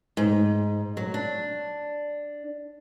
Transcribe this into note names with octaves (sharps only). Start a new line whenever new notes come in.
G#2
F#3
D4